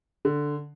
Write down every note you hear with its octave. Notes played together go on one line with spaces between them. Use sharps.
D3